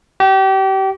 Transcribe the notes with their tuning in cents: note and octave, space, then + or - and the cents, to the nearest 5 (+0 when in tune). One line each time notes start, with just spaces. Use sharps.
G4 -30